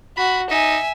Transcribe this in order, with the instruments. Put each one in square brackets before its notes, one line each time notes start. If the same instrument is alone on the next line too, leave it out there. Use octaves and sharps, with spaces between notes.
[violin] F#4 [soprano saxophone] B5
[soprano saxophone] D#4 [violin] E5 G#5